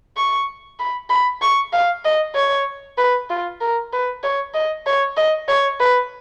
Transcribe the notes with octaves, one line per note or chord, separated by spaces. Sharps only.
C#6
B5
B5
C#6
F5
D#5
C#5
B4
F4
A#4
B4
C#5
D#5
C#5
D#5
C#5
B4